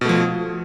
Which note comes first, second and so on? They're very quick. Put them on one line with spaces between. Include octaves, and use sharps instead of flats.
B2 A3 F3